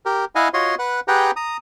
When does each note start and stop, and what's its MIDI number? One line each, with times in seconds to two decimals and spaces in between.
0.06 0.25 67
0.06 0.25 70
0.35 0.48 64
0.35 0.48 75
0.35 0.48 77
0.35 0.48 78
0.35 0.48 80
0.54 0.75 65
0.54 0.75 66
0.54 0.75 73
0.54 0.75 75
0.54 0.75 84
0.79 1.00 71
0.79 1.00 78
1.08 1.31 67
1.08 1.31 68
1.08 1.31 71
1.08 1.31 78
1.08 1.31 79
1.08 1.31 82
1.36 1.57 82
1.36 1.57 87